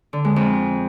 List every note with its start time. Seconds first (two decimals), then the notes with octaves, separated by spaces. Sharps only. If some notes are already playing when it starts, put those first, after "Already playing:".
0.13 D3
0.25 G#3
0.36 F2